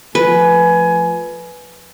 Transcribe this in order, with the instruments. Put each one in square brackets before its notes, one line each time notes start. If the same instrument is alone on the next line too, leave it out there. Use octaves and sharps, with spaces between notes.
[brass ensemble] F3 A3 G#5 [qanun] B4